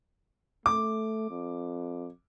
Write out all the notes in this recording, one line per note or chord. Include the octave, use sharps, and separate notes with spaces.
A3 D6
F2